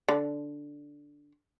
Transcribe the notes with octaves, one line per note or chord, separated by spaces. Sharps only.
D3